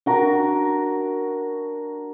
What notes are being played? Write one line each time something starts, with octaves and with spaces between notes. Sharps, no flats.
D4 F#4 A#4